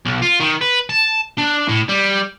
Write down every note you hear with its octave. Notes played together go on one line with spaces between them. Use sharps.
B1
F4
D#3
B4
A5
D4
A2
G3